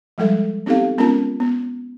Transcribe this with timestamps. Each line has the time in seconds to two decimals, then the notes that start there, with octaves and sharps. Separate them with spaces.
0.18 F3 G3 G#3 A4 E5
0.66 B3 C4 D#4 G4 A4 F5
0.98 G#3 B3 C#4 F4 A#4 A5
1.40 B3